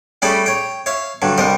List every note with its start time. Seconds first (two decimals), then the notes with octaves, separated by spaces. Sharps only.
0.22 G3 A3 C#4 G#4 D5 B5
0.46 C#5 G5
0.86 C#5 E5 F5
1.22 G2 D3 F#3
1.38 C2 G3 A#4 C5 D#5